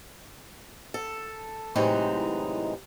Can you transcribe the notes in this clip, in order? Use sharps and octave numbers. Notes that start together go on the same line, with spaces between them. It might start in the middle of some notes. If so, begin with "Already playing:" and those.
A4
A2 C3 E3 F#3 G#3 D#4